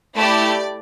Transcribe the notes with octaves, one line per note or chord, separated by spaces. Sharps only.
A3 E4 G4 D5